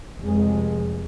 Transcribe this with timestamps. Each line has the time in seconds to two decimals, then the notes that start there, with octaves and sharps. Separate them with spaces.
0.19 F1 G#3